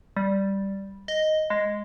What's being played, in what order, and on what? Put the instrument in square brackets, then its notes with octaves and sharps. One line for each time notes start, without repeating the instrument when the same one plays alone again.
[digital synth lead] G3
D#5
G#3